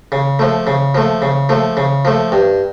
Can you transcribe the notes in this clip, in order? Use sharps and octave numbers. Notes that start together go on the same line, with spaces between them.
C#3
F3 A3
C#3
F3 A3
C#3
F3 A3
C#3
F3 A3
G2